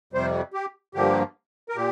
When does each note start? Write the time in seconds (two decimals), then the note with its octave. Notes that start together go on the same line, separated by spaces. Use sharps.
0.13 F2 C3 G3 C5
0.53 G4
0.94 G2 D3 F3 A#3 G4
1.69 A#4
1.76 A#2 G4